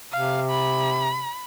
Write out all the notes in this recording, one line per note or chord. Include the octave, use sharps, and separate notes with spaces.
C3 F5
B5